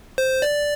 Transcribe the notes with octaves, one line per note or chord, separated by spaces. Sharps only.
C5
D5